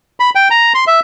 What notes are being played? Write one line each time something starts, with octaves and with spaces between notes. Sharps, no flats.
B5
G5
A#5
C6
E5